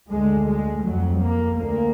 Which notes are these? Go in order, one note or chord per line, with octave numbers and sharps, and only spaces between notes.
D2 G#3
G#3
F2 F#3
A#3
D2 A#3